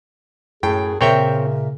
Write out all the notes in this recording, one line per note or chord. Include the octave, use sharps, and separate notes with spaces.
F#2 A2 G#4 G5
A#2 C#3 C4 A#4 C#5 E5 G5